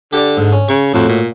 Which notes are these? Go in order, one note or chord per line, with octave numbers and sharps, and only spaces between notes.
D3 G4 D5
G#2
C#4
C#3 C#6
F2 A2 F#4
A#2